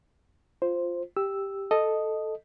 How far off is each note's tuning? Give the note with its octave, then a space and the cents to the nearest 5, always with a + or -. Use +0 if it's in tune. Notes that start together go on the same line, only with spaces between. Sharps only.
F4 +0 C5 +0
G4 +0 E6 +0
A4 +0 D#5 -5